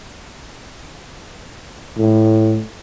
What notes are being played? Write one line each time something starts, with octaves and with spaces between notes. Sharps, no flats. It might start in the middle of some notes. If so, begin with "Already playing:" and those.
A2